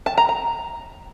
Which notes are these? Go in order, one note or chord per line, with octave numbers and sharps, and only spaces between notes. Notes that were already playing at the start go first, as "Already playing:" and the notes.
A5
A#5
A#5